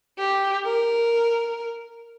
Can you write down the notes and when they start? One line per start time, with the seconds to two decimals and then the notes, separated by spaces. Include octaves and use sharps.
0.18 G4
0.65 A#4